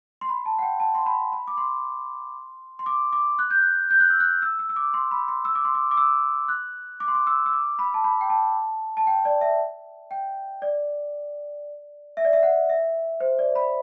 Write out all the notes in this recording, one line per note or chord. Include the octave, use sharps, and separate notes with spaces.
C6
B5
A5
F#5
G5
A5
C6
B5
B5
D6
C6
C6
D6
D6
F#6
G6
F#6
G6
F#6
E6
F#6
E6
E6
E6
D6
C6
B5
C6
E6
D6
C6
D6
D6
E6
F#6
D6
C6
D6
E6
E6
D6
B5
A5
B5
G5
A5
A5
G5
D5
E5
G5
D5
E5
D5
E5
F#5
E5
C5
D5
B5